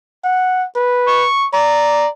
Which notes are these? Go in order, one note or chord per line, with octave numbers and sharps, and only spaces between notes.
F#5
B4
C#6
D5 A#5